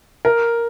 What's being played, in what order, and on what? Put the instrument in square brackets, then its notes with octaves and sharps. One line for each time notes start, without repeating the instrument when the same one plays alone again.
[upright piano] A#4